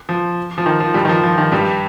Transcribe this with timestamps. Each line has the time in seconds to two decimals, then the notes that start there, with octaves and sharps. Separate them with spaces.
0.09 F3
0.58 F3
0.66 D#3
0.80 F3
0.94 G2 G3
1.05 D#3
1.09 F3
1.23 F3
1.38 D#3
1.52 G2 G3